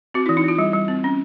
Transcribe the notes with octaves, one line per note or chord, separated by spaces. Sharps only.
C4 F#4
E4
E3
D#4
E3 F4
G3
G3
C4
C#4